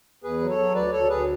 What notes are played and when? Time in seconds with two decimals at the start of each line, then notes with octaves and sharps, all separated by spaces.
0.24 E2 G#4 B4
0.41 F#3
0.49 A4 C#5
0.58 F#3
0.75 D2 B4 D5
0.92 D2 A4 C#5
1.09 D2 G#4 B4